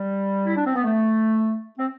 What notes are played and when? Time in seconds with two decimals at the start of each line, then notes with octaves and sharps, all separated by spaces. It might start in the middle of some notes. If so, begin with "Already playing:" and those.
Already playing: G3
0.46 E4
0.56 D4
0.65 C4
0.75 B3
0.84 A3
1.78 C4